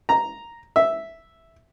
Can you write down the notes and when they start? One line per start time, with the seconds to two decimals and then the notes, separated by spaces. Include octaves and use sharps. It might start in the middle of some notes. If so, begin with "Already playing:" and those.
0.09 A#5
0.76 E5